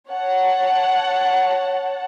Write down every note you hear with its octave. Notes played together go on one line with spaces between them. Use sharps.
C#5 F#5 A5